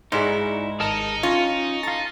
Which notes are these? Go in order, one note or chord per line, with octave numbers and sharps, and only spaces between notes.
G#2 D#4 E4 F#4 G#4 D5
G#1 D#4 G#4 A#4 A5 A#5 C#7
C#4 F4 C#7
F4 A4 A#5 A6